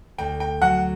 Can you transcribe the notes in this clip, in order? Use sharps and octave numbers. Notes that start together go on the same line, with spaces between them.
D2 G5
G5
F#3 F#5